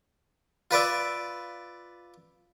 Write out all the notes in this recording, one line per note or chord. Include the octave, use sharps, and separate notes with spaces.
F4 B4 D5 E5